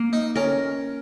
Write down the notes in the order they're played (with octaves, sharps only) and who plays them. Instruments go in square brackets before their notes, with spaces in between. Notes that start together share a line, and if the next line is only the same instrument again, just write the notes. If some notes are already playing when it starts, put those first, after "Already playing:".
Already playing: [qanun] A#3
[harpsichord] D#4
[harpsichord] C#4 [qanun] A#4